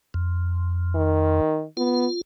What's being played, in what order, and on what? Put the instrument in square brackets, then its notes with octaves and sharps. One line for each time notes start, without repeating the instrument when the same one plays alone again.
[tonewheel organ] F2
[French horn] D#3
[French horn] B3 [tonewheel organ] F4